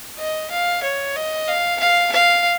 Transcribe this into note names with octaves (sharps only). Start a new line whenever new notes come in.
D#5
F5
C#5
D#5
F5
F5
F5